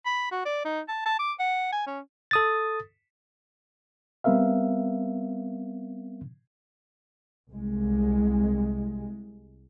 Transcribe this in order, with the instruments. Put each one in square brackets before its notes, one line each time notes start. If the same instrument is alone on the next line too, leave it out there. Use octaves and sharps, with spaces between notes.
[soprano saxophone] B5
F#4
D5
D#4
A5
A5
D6
F#5
G#5
C#4
[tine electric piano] A4 D#6 A6
[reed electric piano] G3 B3 C4 A#4 E5 F5
[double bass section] C2 G#3